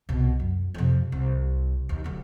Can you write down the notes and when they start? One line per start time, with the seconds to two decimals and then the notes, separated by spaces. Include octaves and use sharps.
0.09 C2 B2
0.40 F#2
0.74 F2 C3
1.12 C2
1.89 D#2
2.04 D1 D2